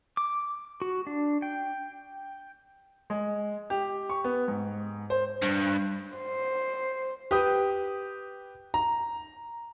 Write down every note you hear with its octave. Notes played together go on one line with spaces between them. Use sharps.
D6
F#4
D4
G5
G#3
G4
C#6
B3
G#2
C5
G2
C5
G4 B4 D#6 G6
A#5